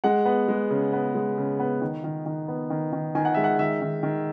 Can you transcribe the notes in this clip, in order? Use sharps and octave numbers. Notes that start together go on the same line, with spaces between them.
G#3 F#5
B3
G#3
C#3
B3
G#3
C#3
B3
D#3
D#3
D#3
B3
D#3
D#3
D#3 G#5
F#5
G#3 E5
F#5
D#3 E5
D#3
D#3